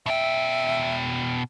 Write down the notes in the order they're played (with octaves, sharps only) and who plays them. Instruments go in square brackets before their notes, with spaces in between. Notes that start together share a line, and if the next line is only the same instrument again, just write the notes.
[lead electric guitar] B2 G5 [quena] E5